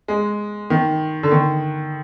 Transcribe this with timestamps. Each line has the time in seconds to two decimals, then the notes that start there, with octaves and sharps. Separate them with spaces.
0.08 G#3
0.70 D#3
1.23 D3
1.31 D#3